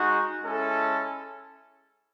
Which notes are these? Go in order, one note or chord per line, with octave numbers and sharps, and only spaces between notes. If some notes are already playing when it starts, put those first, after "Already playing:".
Already playing: G#3 D#4 F#4
G#3 C#4 E4 A4